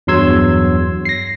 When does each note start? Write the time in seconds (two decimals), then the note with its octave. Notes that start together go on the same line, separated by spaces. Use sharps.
0.07 E2 G2 F#3 C6 E6 G#6
1.05 A#6 C7